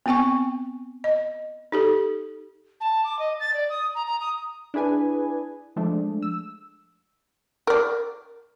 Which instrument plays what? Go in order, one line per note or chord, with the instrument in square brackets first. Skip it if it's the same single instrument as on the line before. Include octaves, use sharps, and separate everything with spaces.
[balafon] B3 C4 G5 G#5 C#6
D#5
D#4 G4 A4
[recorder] A5
D6
D#5
A6
D5
D#6
A#5
A#5
D#6
[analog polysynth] D4 E4 G#4 B4 G#5
F3 G#3 A3 D4
E6
[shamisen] A#4 D5